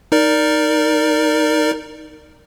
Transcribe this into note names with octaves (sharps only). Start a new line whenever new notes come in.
D#4 A#4 D5